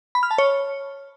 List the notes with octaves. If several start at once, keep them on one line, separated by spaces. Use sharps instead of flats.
B5
F6
A5
C#5